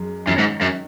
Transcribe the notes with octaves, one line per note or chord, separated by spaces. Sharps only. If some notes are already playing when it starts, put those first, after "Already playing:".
Already playing: F#2 G#3
F#2 D#3 F#3 C#4
G#2
F#2